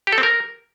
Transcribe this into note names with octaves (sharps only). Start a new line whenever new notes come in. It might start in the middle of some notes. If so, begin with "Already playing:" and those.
G4
A4
C4
A#4